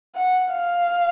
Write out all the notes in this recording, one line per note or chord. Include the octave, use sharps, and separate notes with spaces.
F#5
F5